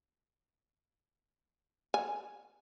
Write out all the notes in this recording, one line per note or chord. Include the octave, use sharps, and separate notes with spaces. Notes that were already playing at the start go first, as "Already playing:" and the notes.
G#5